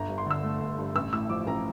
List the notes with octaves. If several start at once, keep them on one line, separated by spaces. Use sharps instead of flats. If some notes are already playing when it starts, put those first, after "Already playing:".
Already playing: G1 A#5
G2
C6
D3 E6
A3
G1
G2
A1 E6
A2 E6
F3 D6
A1 A#5